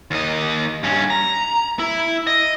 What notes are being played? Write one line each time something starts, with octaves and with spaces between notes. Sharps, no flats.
D#2 D#5
G2 C#4
A#5
E4
D#5